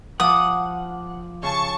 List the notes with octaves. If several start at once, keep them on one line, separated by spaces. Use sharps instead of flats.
F3 F#5 D6 D#6
C#3 A5 C#6